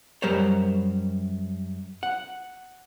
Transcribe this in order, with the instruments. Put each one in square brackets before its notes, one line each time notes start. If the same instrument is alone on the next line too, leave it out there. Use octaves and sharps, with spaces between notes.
[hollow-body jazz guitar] F#2 G3 A#4 C5 C#5
F#5